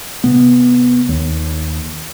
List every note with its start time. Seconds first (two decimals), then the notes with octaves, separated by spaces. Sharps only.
0.24 C3 B3
1.09 D#2